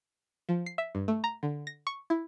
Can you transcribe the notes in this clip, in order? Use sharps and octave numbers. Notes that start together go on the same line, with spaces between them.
F3
C7
E5
G2
A3
A#5
D3
A#6
C#6
E4